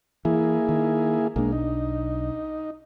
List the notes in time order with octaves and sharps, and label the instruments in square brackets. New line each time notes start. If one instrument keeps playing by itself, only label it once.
[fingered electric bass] E3 [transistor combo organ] A#3 E4 G#4
[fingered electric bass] D#3
[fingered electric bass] B1 D4 [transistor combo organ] G#3 A#3
[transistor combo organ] D#4